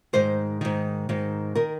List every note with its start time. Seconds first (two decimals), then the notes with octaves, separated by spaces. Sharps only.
0.13 G#2 D#3 C5
0.61 G#2 D#3
1.09 G#2 D#3
1.55 D#3 A#4